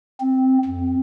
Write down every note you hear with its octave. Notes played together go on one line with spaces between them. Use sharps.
C4
F2